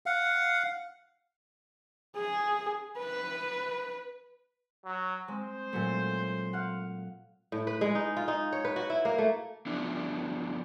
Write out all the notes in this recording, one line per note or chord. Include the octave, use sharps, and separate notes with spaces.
F5 F#5
G#4
B4
F#3
G#3 C4 C5
A#2 F#3 A3
F5 F#5
A2
B4
G#3
D#4
F4
D#4
C#5
B4
F#4
E4
A#3
A3
G2 F3 B3 D4 E4